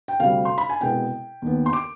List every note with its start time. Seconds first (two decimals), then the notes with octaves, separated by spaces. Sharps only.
0.08 G5
0.20 D2 C3 G3 F5
0.45 C6
0.58 B5
0.69 G#5
0.81 C2 B2 G#3 B3 G5
1.42 D#2 D#3 B3
1.66 C6
1.73 D6